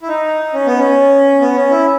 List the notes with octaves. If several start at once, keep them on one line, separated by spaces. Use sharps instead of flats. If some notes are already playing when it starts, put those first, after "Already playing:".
E4
D#4
C#4
B3
C#4
B3
C#4
E4